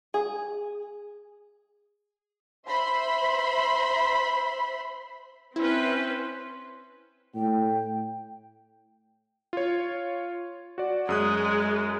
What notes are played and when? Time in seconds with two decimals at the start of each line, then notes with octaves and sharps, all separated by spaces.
0.14 G#4
2.67 C5 E5 B5 C6
5.56 C4 C#4 E4 B4 C5
7.35 A2 G5
9.53 F4 C#5
10.78 F#4 D5
11.09 F#2 G#3 G#4 D#6 F#6